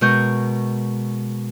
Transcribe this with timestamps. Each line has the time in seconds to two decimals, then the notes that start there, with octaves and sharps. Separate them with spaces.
0.01 B2 G#3 A#4 D#5 C#6 G6